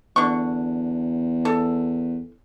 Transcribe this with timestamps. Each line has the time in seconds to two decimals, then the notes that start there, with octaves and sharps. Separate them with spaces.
0.16 E2 D3 C#6
1.45 A4